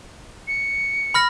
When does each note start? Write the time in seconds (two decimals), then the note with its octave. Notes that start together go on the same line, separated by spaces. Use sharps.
0.48 C#7
1.14 B5 F6 A#6